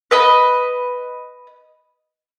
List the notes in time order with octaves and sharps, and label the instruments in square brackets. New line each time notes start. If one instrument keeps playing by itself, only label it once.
[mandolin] B4 D#5 B5